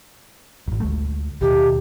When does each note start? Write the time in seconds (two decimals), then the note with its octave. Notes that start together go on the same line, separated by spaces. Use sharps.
0.68 D#1 G#1
0.80 D2 G#3 A3
1.41 D#2 B2 D#3 G4